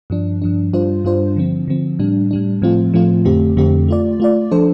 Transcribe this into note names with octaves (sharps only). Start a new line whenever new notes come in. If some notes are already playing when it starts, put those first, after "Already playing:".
G2 F3 D4
G2 F3 D4
G2 G3 D4 F4 C5
G2 G3 D4 F4 C5
D3 F3 C4
D3 F3 C4
A2 G3 D4
A2 G3 D4
A2 F3 A3 C4 F4
A2 F3 A3 C4 F4
F2 D3 A3 C4 G4
F2 D3 A3 C4 G4
A3 F4 D5
A3 F4 D5
F3 D4 A4 C5